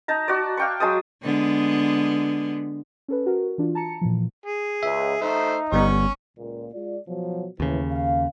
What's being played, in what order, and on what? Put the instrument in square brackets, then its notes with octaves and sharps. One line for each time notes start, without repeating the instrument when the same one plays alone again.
[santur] D#4 A5 A#5
F#4 D5
F5 G5 C#6
F#3 G#3 A5 D#6
[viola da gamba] D3 G#3 B3
[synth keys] C#4 A4 B4
F#4 A#4
E3 D4 F4
A5 A#5 C#7
A#2 E3 F3
[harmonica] G#4
[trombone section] C#2 [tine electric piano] E5
[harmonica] A3 C5 [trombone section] D#4
[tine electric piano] G1 G3 B3 [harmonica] C#4 C#6
[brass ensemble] C#2 A#2
G#3 F4 D5
B2 F3 F#3
[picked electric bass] D#2 C#3 [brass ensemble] A2 E3
[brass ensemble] F5